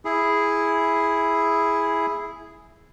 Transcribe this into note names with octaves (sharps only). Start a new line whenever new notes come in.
E4 G#4